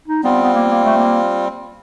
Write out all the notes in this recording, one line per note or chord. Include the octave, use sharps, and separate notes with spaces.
D#4
G3 B3 C4 F4
B3
A#3
A#3
A3
A#3